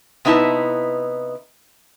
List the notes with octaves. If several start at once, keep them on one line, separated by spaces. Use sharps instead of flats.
C3 B3 D#4 E4 B4 A5